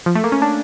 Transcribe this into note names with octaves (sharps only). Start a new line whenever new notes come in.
F3
A3
A#3
C#4
D4